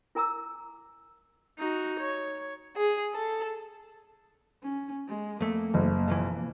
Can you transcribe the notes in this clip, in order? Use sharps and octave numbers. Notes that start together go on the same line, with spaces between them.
E4 A#4 G#5 A#5 D6 E6
D#4 F#4
C#5
G#4
A4
C#4
G#3
F2 A3 A#3
F#1
B1 F2 E3